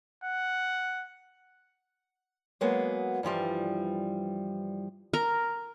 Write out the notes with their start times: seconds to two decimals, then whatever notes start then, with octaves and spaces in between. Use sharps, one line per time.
0.24 F#5
2.61 F#3 G#3 A#3 B3 F#4 G#4
3.23 G2 E3 F3 G3
5.13 A#4